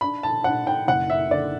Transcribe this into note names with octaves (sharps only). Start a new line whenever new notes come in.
D4 B5
A5
D4 F#5
G5
F#1 F#5
E5
D3 D5